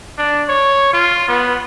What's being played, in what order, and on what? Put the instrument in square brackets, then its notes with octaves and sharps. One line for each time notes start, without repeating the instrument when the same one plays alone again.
[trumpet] D4
C#5
F4
B3